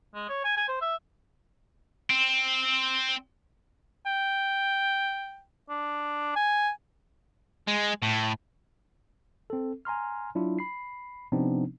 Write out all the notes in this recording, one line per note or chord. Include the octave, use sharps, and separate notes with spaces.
G#3
C#5
G#5
G#5
C5
E5
C4
G5
D4
G#5
G#3
A2
C4 A4
G#5 A#5 C6 F6
F#3 D4 E4 F4
B5 C7
C3 F3 B3 C4 D4 D#4